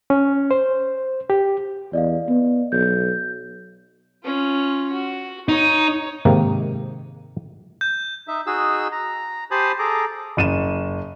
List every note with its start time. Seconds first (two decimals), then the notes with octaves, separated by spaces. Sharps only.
0.10 C#4
0.51 C5
1.30 G4
1.93 E2 D5 D#5 F5
2.29 B3
2.72 B1 G6
4.24 C#4 F4
4.92 F#4
5.49 D#4 C#5
6.25 G#2 C3 D#3 A#3
7.81 G6
8.28 D#4 E5
8.47 D#4 F#4 G#4 E6
8.92 A#5
9.51 G4 C5 G#5 A5 B5 D#6
9.79 G#4 A4 A#5 D6
10.37 F#1 D#7 E7